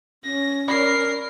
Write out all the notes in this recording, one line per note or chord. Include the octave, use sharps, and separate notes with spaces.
C#4 A#6
A#4 D5 B5 C7